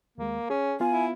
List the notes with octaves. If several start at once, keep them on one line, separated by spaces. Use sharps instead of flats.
D#2 G#3 A#3
C#4 G#4
B3 F4 F5 G#5
E4